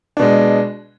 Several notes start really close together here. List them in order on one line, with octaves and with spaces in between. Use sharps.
D4 B2 G#3